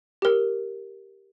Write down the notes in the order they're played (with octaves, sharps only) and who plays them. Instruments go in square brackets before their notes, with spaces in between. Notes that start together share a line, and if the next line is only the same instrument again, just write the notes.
[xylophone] G4 A#4